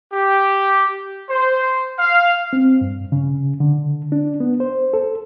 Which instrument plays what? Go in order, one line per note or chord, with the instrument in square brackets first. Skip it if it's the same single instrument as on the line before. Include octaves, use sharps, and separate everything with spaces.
[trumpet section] G4
C5
F5
[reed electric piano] C4
G2
C#3
D3
D4
B3
C5
A4